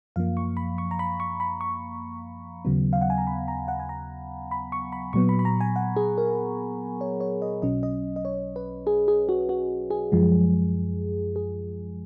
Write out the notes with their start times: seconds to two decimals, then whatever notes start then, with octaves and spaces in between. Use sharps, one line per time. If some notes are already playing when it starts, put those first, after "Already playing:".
0.16 F#2 F3 A#3 F5
0.37 C#6
0.57 B5
0.78 C#6
0.91 A#5
0.99 B5
1.20 C#6
1.40 B5
1.61 C#6
2.65 D#2 C#3 F#3 B3
2.93 F5
3.01 F#5
3.10 G#5
3.18 A#5
3.27 B5
3.48 A#5
3.68 F#5
3.80 G#5
3.89 A#5
4.51 B5
4.72 C#6
4.92 B5
5.13 A#2 F#3 B3 C#6
5.29 B5
5.39 B5
5.45 A#5
5.60 G#5
5.76 F#5
5.96 G#4
6.18 A#4
7.01 C#5
7.21 C#5
7.42 D#5
7.62 B1 B2 F#3 C#4 D#5
7.83 D#5
8.16 D#5
8.25 C#5
8.56 B4
8.87 G#4
9.08 G#4
9.29 F#4
9.49 F#4
9.91 G#4
10.12 F#2 F3 G#3
11.36 G#4